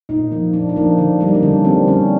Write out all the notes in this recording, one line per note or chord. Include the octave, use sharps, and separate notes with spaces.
A#2 D#4
F3 A#3
A#2 D4
D4
F3 A#3 D#4
D3 D4
G3 A#3 D4
D#4
D4
D3 C#4
G3 A#3 C4
D3 C#4